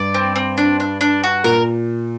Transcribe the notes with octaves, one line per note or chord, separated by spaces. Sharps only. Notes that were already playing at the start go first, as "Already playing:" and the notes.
Already playing: G2 D5
C4
C4
D4
D4
D4
F#4
A#2 A#4